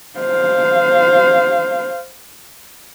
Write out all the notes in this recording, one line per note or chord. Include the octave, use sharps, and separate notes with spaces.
C5 F5